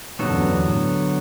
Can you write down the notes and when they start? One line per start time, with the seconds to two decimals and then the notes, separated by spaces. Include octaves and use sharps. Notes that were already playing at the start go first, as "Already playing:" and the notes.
0.19 G2 B2 D3 F#3 B3 F#4 A4
0.30 E2 G2
0.40 F#2
0.50 E2 G2
0.66 A2